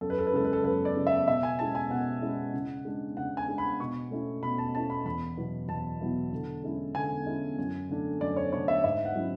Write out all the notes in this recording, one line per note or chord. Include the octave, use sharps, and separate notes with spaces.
F#2 A4
B4
A4
B4
C#3 G#3 A4
B4
A4
F#2 B4
D5
C#3 G#3
E5
B2 E5
G#5
G#3 C#4 E4 A5
G#5
B2 F#5
G#3 C#4 E4
C#3
G#3 D4
C#3 F#5
G#5
G#3 D4
B5
B2 C#6
A3 C#4 E4
B2 B5
A5
A3 C#4 E4 A5
B5
E2 B5
B2 F#3 B3 E4
E2 A5
B2 F#3 B3 E4
D3
G#3 C#4 E4
D3 G#5
G#3 C#4 E4
F#2
D3 A3 D4
F#2 D5
C#5
D3 A3 D4 C#5
E5
G#2 E5
F#5
F#3 C#4 E4